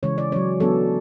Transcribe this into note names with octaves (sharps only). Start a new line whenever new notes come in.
C#3 E3 G#3 C#4 C#5
D5
F#3 C#4 C#5
F#3 B3 D4 A4